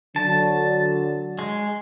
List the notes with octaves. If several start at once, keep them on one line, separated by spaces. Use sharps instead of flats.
D3 F#3 A5
G#3